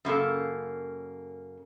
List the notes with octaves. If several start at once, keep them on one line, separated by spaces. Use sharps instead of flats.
F#2 C#3 A#3 A4